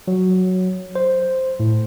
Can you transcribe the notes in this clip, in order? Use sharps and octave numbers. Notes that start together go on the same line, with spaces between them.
F#3
C5
A2